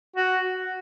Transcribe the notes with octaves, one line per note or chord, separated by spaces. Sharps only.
F#4